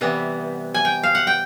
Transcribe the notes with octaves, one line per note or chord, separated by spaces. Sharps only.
C3 E3 G3 B3
G#5
G5
F5
F#5
G5